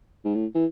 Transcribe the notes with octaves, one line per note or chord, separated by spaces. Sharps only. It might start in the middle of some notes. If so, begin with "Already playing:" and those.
G#2
A2
E3